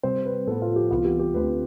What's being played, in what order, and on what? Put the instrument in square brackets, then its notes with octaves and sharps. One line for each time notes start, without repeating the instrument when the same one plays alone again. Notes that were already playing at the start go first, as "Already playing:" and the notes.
[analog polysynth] C3 G3 C4 [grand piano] C5
[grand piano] B4
[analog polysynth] A2 F3 B3 [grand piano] A4
[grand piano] F4
G4
[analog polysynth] C2 C3 E3 B3 [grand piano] F4
[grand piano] G4
G4
[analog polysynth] D2 D3 A3 C4 [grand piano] B4